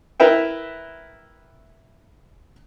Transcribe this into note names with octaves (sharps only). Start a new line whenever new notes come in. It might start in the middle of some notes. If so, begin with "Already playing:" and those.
E4 A#4 B4 E5 G5